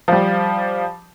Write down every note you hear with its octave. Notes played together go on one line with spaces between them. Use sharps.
F3 G3